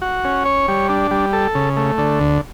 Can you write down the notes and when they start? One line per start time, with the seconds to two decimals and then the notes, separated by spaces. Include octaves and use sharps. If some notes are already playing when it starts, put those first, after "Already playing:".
0.02 F#4
0.25 C#4
0.45 C#5
0.68 G3
0.89 D4
1.11 G3
1.33 A4
1.55 C#3
1.77 A3
1.98 D3
2.20 D2